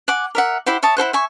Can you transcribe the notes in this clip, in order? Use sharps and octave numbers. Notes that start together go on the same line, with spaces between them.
F#5 G#5 D6
A#4 E5 F#5
E4 G4 C5 F#5
C#5 E5 A5 D#6
E4 A4 C5 F#5
E5 G#5 C#6